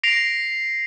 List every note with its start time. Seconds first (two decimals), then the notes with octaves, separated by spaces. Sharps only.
0.03 A#6 C7 D7 F7